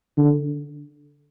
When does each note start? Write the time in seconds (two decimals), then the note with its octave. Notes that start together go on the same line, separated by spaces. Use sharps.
0.18 D3